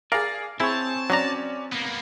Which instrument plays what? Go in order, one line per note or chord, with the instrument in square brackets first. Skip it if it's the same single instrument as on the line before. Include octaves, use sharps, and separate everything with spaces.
[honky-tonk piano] G#4 F5 [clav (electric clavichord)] A#4 [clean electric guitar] D5
[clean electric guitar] C4 C#5 [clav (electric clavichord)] E4 [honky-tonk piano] G#4 [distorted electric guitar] A5
[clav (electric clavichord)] F#3 A#5 [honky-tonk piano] C#4 D5
[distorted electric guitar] A#3 B3